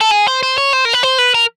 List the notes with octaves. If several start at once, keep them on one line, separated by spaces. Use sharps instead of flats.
A4
G#4
C5
C5
C#5
C5
A#4
B4
C5
B4
A#4